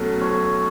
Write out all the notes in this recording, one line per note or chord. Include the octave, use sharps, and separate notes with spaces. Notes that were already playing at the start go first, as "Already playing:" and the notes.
Already playing: B1 B2 F#3 A3 C#4 A4
C#5